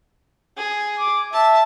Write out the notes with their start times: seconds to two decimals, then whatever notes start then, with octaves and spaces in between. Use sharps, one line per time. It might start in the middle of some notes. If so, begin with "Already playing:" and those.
0.57 G#4
0.99 D6
1.33 E5 A5